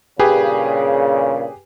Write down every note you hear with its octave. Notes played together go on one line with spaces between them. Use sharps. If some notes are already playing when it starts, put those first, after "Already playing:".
G2 A#2 C#3 G4 G#4 B4